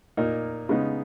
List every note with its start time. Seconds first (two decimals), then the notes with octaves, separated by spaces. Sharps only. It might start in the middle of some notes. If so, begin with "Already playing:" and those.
0.17 A#2 A#3 D#4
0.69 C#3 G#3 B3 D#4